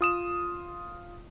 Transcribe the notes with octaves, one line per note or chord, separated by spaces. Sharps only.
F4 D#6 E7